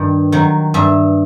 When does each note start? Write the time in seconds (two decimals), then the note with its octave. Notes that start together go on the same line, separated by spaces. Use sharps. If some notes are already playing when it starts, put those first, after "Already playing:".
Already playing: G2 D#3
0.32 D#3 F#3
0.74 G2 E5